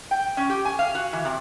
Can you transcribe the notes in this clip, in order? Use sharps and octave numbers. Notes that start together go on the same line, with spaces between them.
G5
C#4
G4
G#5
F5
F#4
E3
C3